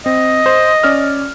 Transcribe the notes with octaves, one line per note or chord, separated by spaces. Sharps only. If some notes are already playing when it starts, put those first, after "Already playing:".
C4 D#5
C5
C#4 D5 F6